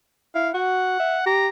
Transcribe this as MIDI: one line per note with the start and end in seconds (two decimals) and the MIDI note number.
0.35 0.52 64
0.35 0.49 77
0.54 0.97 66
0.54 1.22 78
1.00 1.19 76
1.26 1.48 67
1.26 1.48 82